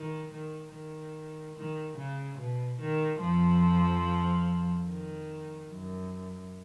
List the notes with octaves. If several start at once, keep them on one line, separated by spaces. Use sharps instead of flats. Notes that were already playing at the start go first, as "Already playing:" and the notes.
Already playing: D#3
D#3
D#3
D#3
C#3
B2
D#3
F2 F3
D#3
F#2